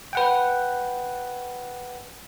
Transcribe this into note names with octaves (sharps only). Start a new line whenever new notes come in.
B4 F#5 G5